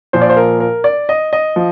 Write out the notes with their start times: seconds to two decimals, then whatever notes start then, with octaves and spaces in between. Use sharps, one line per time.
0.13 A#2 F3 C5
0.21 D5
0.29 C5
0.37 A#4
0.60 A#4
0.84 D5
1.09 D#5
1.33 D#5
1.56 F3